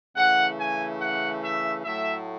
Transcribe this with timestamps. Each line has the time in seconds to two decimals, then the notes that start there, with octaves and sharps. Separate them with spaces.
0.16 C#3 E3 A3 F#5
0.58 G#5
1.01 F#5
1.43 E5
1.85 A2 F#3 A3 E5